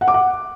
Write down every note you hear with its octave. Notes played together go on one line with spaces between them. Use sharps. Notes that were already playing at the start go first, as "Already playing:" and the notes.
F#5
D6
F#5